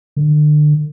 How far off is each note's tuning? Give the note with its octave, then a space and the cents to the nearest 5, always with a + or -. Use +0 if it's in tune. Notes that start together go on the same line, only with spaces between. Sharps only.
D3 +35